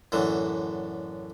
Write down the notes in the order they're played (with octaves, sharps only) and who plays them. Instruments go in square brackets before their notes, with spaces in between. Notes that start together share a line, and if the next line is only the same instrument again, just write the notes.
[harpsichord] F#2 A2 D3 E3